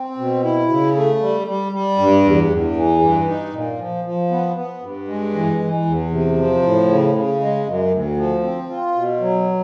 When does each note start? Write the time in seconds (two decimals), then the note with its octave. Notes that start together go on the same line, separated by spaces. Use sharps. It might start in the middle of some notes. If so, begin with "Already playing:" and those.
Already playing: C4
0.18 B2
0.44 E4
0.69 C#3
0.95 A3
1.21 G3
1.47 G3
1.72 G3
1.98 G2
2.24 E2
2.50 E2
2.76 E3
3.02 G2
3.28 D#4
3.53 A#2
3.79 F3
4.04 F3
4.31 B3
4.56 B3
4.82 G2
5.08 G#3
5.34 E3
5.59 E3
5.85 E2
6.11 C3
6.37 F3
6.63 A2
6.88 C#3
7.15 C#3
7.41 G#3
7.65 F#2
7.91 D2
8.17 F3
8.43 C4
8.69 F4
8.95 B2
9.21 F#3